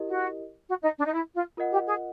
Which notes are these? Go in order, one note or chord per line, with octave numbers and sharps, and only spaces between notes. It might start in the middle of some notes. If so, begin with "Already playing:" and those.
Already playing: E4 G4 A#4 D#5
F#4
F#4
D#4
D4
D#4
E4
F4
F4 A#4 D#5 F#5
G4
G#4